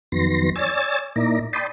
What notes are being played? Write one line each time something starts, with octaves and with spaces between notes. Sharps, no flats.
F2 D#3 F#3 B3 C6 A#6
C#5 D5 G#5 E6 A6
A#2 A#3 D#4 E4 D5 A#5
D5 G5 A5 B5 C6 D#6